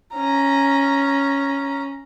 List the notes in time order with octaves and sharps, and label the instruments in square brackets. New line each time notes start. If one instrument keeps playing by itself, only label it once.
[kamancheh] C#4 A#5